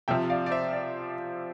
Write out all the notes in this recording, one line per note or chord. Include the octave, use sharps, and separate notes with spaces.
C3 F3 E5 G5
D5 F5
D5
C5 E5
D5